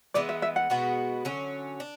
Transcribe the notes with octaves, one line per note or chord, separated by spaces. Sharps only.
E3 G#3 B3 D5
E5
E5
F#5
B2 G#3 B3 F#4
D3 F#3 C#4
D4